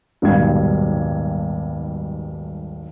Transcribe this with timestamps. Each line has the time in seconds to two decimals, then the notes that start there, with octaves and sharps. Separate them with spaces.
0.22 D#1 B1 G#2 G3 F5 G#6